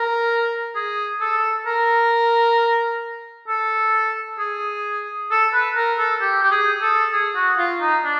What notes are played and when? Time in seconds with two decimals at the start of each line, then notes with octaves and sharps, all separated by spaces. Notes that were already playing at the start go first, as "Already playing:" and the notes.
Already playing: A#4
0.75 G#4
1.21 A4
1.66 A#4
3.48 A4
4.39 G#4
5.31 A4
5.53 B4
5.76 A#4
5.98 A4
6.21 G4
6.43 G4
6.51 G#4
6.82 A4
7.13 G#4
7.36 F#4
7.58 F4
7.81 D#4
8.04 D4